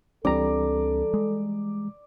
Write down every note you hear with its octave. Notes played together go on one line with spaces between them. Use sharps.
C#2 E3 G3 C4 D4 A4 D5 A#5
G#3